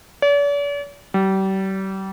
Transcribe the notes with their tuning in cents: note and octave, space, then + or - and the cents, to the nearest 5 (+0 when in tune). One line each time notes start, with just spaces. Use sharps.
D5 -45
G3 -35